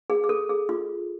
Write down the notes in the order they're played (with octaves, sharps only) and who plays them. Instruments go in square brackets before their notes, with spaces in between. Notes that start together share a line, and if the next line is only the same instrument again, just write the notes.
[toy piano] G#4
G#4
A4
G#4
F4